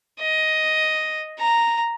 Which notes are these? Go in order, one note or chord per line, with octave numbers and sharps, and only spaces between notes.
D#5
A#5